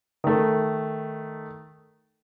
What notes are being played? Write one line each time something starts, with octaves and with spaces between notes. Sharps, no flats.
D#3 A3